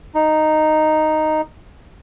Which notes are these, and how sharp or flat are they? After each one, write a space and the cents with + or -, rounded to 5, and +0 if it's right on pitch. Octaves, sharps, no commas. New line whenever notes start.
D#4 -5